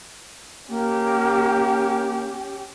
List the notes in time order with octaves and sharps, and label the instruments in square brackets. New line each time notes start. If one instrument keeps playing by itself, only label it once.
[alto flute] A#3 [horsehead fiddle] C#4 G4